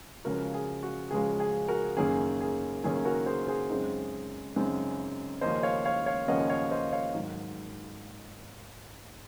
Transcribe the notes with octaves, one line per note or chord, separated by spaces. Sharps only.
C#2 C#3 F3 G#3 C#4 F#4 A#4
G#4
F#4
C#2 C#3 F3 G#3 C#4 G#4
G#4
F#4 A#4
F#1 F#2 D#3 A#3 C#4 G#4
G#4
F#1 F#2 D#3 A#3 C#4 G#4
F#4 A#4
G#4 C5
G#4 C5
F#2 C#3 G#3 C4 D#4
F#2 C#3 G#3 C4 D#4
D#2 C#3 F3 A#3 C#4 C5 D#5
C#5 F5
C#5 F5
C#5 F5
D#2 C#3 F3 A#3 C#4 D#5 F#5
C#5 F5
C5 D#5
C#5 F5
G#2 D#3 F#3